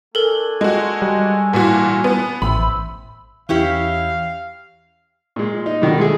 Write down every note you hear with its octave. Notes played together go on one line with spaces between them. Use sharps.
A3 D4 A4 A#4 G#5
G#3 F#4
G3
A#2 E3 F#4
B3
A1 C4 E5 B5
E2 E3 C#4 E4 G4 F5
A#2 G#3
D#4
B2 D3 D#3 G3
G#3 A3 G#4